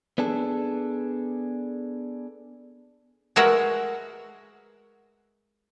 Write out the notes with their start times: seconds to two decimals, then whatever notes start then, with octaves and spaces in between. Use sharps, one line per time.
0.18 B3 D4 G#4 A4
3.36 G#3 F#4 A#4 B4 E5 F#5